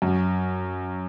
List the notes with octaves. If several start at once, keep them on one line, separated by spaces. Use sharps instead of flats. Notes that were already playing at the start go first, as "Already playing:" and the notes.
F#2